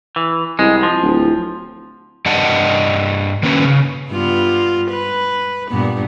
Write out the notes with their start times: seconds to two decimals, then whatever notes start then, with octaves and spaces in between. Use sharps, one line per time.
0.16 E3
0.59 C2 G#3
0.83 F3
1.03 D1
2.26 G2 D4 G4 D#5 F#5 A5
3.43 D#3 A#3 C#4 B4
3.64 C#3
4.11 G2 B3 F4
4.91 B4
5.70 G2 A#2 B3